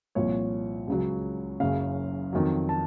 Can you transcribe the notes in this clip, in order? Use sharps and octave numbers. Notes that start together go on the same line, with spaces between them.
C2 A#2 F3 C#5
C#2 C#3 F#3
F#1 F#2 C#3 F5
F2 D#3 F#3
A5